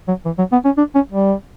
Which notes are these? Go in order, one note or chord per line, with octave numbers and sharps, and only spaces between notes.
F#3
E3
F#3
B3
C#4
D4
C#4
G3